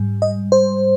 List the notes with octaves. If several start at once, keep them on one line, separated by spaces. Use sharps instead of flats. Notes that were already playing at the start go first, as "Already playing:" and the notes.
Already playing: G#2 G3
D#5
C5